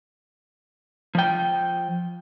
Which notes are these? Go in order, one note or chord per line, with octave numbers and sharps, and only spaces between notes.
F3 G5